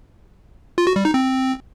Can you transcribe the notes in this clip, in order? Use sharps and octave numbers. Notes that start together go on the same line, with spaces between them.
F4
F#4
G3
D#4
C4